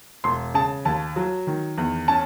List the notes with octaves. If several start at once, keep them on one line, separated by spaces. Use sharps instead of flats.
E1 C6
C#3 A5
D#2 A5
F#3
D#3
E2
C#4 A5